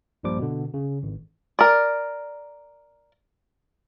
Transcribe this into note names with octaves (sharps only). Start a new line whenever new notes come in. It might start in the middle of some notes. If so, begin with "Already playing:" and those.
A#1 G2 A#2 F3 G3 D6
B2 D3
C#3
G#1
A#4 D5